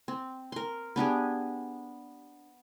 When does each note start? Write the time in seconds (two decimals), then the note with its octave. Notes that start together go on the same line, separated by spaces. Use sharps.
0.08 C4
0.52 A#4 C6
0.96 B3 D4 G4 G#4